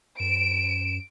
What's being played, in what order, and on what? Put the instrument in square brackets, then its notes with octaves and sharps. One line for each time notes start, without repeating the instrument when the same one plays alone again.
[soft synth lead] F#2 [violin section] D7 [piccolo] E7